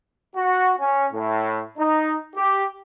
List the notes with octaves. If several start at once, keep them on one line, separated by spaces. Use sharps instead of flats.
F#4
C#4
A2
D#4
G4